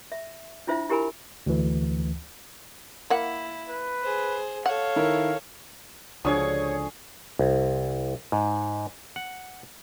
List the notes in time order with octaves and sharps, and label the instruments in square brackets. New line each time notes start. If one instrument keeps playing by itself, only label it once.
[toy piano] E5
D4 E4 F4 C5 E5
E4 G4 A#4 G#5 B5
[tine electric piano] D2 E3
[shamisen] A#3 F#5 [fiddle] E4
[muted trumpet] B4
[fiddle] G#4 C5
[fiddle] A4 C#5 [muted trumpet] F5 [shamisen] F#5
[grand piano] D#3 E4 A#4
[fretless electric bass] C#2 [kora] D3 F3 F#4 [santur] G#4 C#6 D#6 [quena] C#5
[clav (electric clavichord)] C2
G#2
F#5